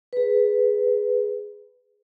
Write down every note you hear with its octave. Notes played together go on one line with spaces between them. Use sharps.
G#4 B4